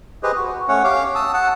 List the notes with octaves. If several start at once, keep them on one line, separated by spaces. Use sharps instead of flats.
G4 G#4 B4 C5 D#5
F#4
A3 C#4 C#5 F#5
G4 C#5 F5 D6
A5 D#6 E6
F#5 A5